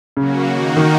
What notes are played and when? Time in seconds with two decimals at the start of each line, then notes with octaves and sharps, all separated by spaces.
0.17 C#3 F#3 A#3 C#4 F#4
0.47 D#3 A#3 D#4 F#4
0.77 D#3